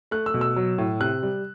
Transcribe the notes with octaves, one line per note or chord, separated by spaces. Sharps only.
A3 F#6
E6
B2
E6
F#3
A2
C3 F#6
G3